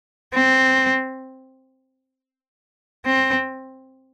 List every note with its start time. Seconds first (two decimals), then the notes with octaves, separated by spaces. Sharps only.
0.34 C4
3.06 C4